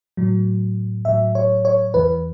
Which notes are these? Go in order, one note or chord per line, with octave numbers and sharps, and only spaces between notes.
A2 F#3
A2 F#3 E5
C#5
C#5
E2 E3 B4